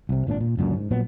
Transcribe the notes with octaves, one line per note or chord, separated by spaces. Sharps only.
C2 C3
G#1 A#2 C4 D4
A#2
C#2 F#2 A#2 D3
G#2
A#1 A#2 F#3 B3